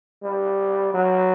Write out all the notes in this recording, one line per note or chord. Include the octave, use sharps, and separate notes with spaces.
G3
F#3